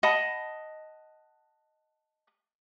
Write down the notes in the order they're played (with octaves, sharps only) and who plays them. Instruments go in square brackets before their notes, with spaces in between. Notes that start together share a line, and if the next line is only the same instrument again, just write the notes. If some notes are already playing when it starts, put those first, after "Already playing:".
[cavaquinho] D#5 F#5 A5 B5